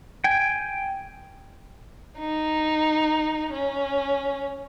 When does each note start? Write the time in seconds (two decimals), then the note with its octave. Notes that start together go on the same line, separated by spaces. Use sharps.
0.24 G5 G#5
2.19 D#4
3.53 C#4